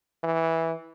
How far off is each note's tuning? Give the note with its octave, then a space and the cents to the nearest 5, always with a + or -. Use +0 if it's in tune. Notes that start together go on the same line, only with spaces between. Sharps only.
E3 -10